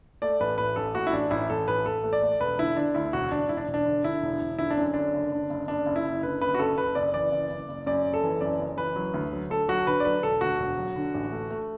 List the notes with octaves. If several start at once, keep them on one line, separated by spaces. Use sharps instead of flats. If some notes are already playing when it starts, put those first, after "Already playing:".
A3 D5
A1 B4
A2 B4
A1 A4
A2 F#4
E4
A1 D4
A1 E4
A1 A4
A1 B4
A1 A4
A3
D5
A3
E1 B4
D3 E4
D3 D4
D2 E4
E1 F#4
E1 D4
E1 E4
D4
E1
D4
D3
D3 E4
E1
E1
D3 E4
D4
F#2
D3 D4
F#1
D3
F#1
F#1 D4
F#1
E4
F#1
D3 B4
F#1 B4
F#4
F#1 A4
F#1 B4
F#1 D5
E3 D5
F#1
F#1
F#1
F#2 D5
F#1
A4
E3
F#2 D5
F#1
E3 B4
F#3
D2
F#3
D2 A4
F#3 F#4
D3 B4
D5
F#3 B4
E1 A4
D2 F#4
E1
F#3
D3
A1
A3
A3